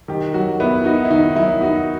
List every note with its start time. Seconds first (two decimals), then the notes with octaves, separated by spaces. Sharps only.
0.08 D#3 G4
0.34 F#3 F#4
0.60 B3 E4
0.84 D#4 F#4
1.05 E4
1.10 D#3 D#4
1.35 F#3 E4
1.61 D#4 F#4